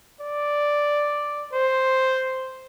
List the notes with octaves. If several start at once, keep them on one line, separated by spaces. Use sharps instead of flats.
D5
C5